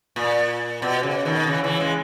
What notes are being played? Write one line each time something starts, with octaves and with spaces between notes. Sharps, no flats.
A#2
B2
C#3
B2 D#3
C#3 E3
C#3 E3
E3 G#3